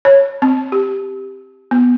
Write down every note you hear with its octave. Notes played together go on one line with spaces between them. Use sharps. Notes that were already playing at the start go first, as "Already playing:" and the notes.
C#5
C4
G4
B3